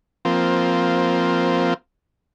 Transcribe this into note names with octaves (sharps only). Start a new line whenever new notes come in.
F3 A#3 C4